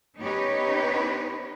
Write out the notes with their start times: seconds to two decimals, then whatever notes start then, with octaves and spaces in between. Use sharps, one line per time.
0.20 B3 C#4 D#4 G4 B4 C#5